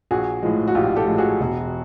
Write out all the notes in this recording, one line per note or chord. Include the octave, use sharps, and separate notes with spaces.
A#1 F#4 G#4
A2 F3 G#3
F#4
A#1 F4 G4
G4 A4
A2 F3 G#3
F#4 G#4
E1